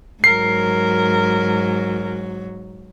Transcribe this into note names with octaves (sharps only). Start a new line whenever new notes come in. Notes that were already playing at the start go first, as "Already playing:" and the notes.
G#2 F#3 A#4 C7